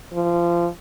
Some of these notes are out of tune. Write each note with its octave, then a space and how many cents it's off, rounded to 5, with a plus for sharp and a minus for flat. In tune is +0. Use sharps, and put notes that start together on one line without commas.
F3 -25